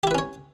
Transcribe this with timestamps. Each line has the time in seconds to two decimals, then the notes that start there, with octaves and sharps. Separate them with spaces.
0.03 G4
0.07 E4
0.11 B4
0.15 C#4
0.18 C#5